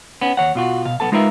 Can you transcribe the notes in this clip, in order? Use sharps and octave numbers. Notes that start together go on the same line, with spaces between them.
B3 C#4
D#2 C#5 F#5
B2 F4 F#4
B2 F5
B1 C#3 B3 A4 A5
G#3 D#4 F4 A#4 B4 E5